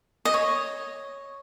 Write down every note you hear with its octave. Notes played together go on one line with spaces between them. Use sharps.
D#5
C#5